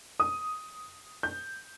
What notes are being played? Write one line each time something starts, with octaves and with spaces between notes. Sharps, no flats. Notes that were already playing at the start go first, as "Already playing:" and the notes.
D#6
G6